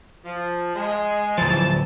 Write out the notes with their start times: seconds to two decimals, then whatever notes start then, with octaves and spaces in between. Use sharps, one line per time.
0.25 F3
0.75 G#3
1.38 D1 E3 F3 A5